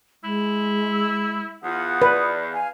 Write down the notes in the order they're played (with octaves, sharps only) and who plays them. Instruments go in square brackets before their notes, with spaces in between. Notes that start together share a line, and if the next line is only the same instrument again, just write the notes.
[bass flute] G#3 [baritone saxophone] E4
[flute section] E6
[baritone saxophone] E2 [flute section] F4 F#5 D#6
[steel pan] B4 [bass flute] D5
[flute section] F5 G#5